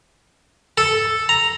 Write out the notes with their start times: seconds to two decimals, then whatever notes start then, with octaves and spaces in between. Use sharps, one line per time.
0.78 A4
1.29 A#5